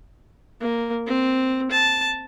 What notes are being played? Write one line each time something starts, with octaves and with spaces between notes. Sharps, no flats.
A#3
C4
A5